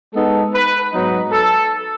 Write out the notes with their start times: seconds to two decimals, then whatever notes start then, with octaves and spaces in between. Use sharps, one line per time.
0.15 G#3 B3 D#4 A4
0.54 B4
0.93 G#2 F#3 B3 D#4
1.32 A4